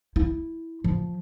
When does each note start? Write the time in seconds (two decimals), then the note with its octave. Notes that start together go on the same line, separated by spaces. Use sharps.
0.16 E4
0.84 F3